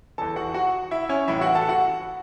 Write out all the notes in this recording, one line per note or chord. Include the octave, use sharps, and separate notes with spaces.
E2 E3 A4 A5
F#4 F#5
F#4 F#5
E4 E5
C#4 C#5
A1 A2 E3 E4 E5
F#4 F#5
A4 A5
F#4 F#5